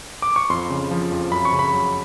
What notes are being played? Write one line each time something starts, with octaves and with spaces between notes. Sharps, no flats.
D6
C#6
F2 C6
C#3
F3
F2
F#2 B5
C#6
C#3
B5
F#3